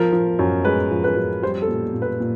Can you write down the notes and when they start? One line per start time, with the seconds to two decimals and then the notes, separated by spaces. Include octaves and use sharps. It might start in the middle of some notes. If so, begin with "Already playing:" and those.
Already playing: F3 A#4
0.12 F3
0.39 F#2
0.65 G#3 B4
0.91 F3
1.04 B4
1.17 F#2
1.43 G3 C5
1.62 A4
1.68 A#2
1.94 A#2
2.02 B4
2.20 A#2